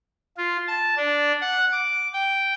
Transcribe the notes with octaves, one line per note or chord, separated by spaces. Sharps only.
F4
A5
D4
F#5
D6
G5